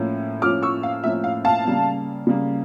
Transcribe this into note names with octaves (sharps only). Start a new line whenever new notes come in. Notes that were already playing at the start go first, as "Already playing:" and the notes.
Already playing: A2 F3 A#3 C#4
A2 F3 A#3 C#4 D6 F6
C#6 E6
F5
A2 F3 A#3 C#4 E5
F5
F5 A5
C#3 G3 A#3
C#3 G3 A#3